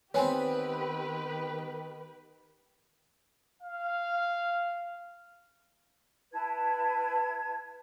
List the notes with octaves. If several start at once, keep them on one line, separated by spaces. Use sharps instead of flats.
D#3 B3 C4 G4 B4 C#5 G#5
F5
E4 B4 A5 G#6